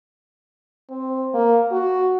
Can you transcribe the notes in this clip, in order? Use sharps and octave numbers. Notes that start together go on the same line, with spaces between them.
C4
A#3
F#4